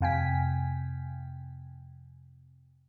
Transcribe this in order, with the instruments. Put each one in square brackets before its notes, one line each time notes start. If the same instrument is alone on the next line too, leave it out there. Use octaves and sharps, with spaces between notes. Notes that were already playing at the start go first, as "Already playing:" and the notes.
[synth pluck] F2 C3 F5 G5 G#5 B6